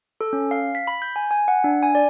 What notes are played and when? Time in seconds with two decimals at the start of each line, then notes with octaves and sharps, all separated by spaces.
0.21 A4
0.33 C#4
0.51 F5
0.75 B6
0.87 B5
1.02 G6
1.16 G#5
1.31 G#5
1.48 F#5
1.64 D4
1.83 G#5
1.95 D5